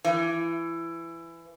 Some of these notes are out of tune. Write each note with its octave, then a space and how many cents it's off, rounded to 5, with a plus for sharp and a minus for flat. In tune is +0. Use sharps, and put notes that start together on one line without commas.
E3 +20